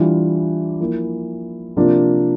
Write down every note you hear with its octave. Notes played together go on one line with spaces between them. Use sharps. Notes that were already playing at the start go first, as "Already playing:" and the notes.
Already playing: E3 G3 D4 F4
F3 A#3 E4
C3 F3 A#3 D4 F4